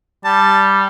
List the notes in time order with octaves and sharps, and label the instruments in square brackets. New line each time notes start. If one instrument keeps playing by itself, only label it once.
[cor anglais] G3 [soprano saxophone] A5